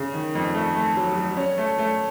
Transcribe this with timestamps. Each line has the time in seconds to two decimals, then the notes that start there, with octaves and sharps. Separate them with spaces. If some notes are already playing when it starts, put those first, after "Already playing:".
Already playing: C#3
0.14 D#3
0.35 F2
0.54 A3
0.76 A3
0.97 F#3
1.17 F#3
1.37 C#4
1.58 A3
1.79 A3